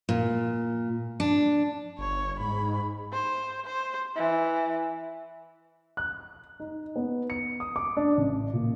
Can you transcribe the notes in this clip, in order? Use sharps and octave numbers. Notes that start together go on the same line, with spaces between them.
A#2
D4
G1 C#5
G#2 B5
C5
C5
E3
F#6
D#4
B3
C#7
D#6
D6
D4
A1
A#2